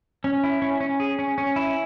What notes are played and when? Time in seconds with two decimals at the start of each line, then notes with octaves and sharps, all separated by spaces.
0.24 C#4
0.43 E4
0.62 C#4
0.80 C#4
1.00 G#4
1.19 C#4
1.38 C#4
1.56 E4